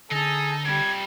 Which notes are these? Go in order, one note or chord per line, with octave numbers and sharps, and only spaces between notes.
D3 D#4 G#4 A5 E6
F2 C3 G3 G#6